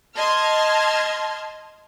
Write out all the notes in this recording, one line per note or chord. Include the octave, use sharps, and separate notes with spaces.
D#5 A5 C6 F6 G#6